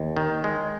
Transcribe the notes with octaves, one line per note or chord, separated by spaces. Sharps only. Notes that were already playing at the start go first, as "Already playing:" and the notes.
Already playing: D#2
D#3
G#3